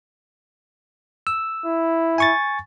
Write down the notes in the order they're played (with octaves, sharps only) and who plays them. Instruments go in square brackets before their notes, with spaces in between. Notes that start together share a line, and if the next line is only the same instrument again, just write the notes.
[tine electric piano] E6
[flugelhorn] E4
[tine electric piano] G#5 C#6 A6